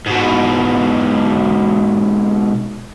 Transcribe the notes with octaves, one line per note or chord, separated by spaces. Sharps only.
G#2 B2